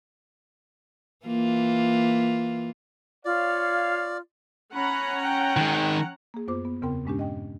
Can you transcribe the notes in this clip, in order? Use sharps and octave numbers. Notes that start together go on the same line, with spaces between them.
E3 A#3 F4
F4 C#5 D5 F5
C#4 F#5 A#5 B5
G5
D#3 G#3
A#3 G#4
F#2 B3 F4 C5 D6
B3
E2 C#3 B3 C4 A#4 G5
G2 A#2 G#3 C#4 D4 G4
D#5 G5